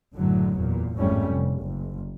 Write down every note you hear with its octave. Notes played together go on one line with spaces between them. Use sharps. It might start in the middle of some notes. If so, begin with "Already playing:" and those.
F#1 A2 D3 F#3
E2 A#2
G#1 F2 A2 G3 A3 C#4
F1
F#1